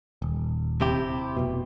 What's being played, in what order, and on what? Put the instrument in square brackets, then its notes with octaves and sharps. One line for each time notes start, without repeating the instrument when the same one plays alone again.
[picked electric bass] D#1
[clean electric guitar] C3 E4 G4
[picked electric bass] F1 B2